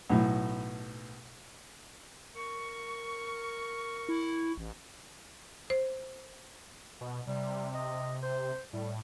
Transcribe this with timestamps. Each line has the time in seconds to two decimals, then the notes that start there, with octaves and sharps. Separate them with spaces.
0.09 B1 A2
2.35 A#4 C#6
4.09 E4
4.57 A1
5.70 C5
7.01 B2
7.27 C3 G3
7.75 D#5
8.23 C5
8.73 A2 G3